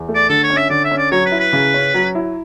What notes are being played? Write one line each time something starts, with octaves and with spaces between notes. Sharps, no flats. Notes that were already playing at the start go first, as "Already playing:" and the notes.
Already playing: E2
A3
D5
D3 A4
C#5
C#4
E5
D3 D5
E5
C#4
D5
F#3 C#5
B4
E4
B4
C#3
C#4
F#3
E4